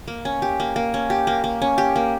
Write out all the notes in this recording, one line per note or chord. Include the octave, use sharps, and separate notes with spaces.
A#3
C#4
G4
A#3
A#3
C#4
G4
A#3
A#3
C#4
G4
A#3